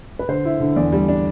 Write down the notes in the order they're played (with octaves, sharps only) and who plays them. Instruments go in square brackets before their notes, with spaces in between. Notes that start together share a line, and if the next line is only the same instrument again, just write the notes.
[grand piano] B4
D3 C5
E4
D3
E2 D5
G3
D4